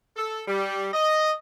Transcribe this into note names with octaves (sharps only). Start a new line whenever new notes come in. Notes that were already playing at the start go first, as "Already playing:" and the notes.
A4
G3
D#5